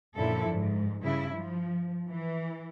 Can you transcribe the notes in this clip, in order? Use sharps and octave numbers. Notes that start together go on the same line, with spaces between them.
F#2 A#2 D3 F3 E4 A4
G#2
G2 C#3 E4
F3
E3